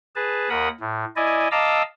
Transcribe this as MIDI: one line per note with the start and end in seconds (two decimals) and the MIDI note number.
0.16 0.49 68
0.16 0.49 71
0.16 0.49 81
0.50 0.69 39
0.50 0.69 70
0.50 0.69 78
0.50 0.69 83
0.50 0.69 87
0.80 1.05 45
1.16 1.48 64
1.16 1.48 74
1.16 1.48 75
1.16 1.48 80
1.51 1.83 75
1.51 1.83 77
1.51 1.83 81
1.51 1.83 82
1.51 1.83 86
1.51 1.83 88